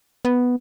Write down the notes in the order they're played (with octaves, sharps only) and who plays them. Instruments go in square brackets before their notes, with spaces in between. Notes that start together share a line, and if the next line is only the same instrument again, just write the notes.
[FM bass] B3